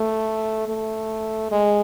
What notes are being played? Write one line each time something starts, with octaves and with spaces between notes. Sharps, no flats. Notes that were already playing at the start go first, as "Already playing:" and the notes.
Already playing: A3
A3
G#3